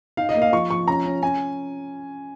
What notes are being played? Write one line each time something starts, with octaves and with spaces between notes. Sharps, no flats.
D#4 F5
D#5
A#3
F5
F3 C#6
F3 C#6
C#4 A#5
C#4
C#4 G#5